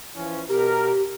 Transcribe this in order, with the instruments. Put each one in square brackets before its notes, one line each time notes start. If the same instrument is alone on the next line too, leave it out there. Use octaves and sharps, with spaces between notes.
[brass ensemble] E3 F3 C#4
[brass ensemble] B2 A#4 [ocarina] G4